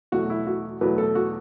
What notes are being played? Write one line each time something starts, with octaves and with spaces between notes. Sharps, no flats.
E2 B2 F#3 A3 F#4
E4
F#4
E2 B2 F#3 A3 B4
A4
F#4